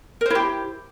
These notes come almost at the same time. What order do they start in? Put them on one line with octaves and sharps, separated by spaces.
A#4 C5 E4 G4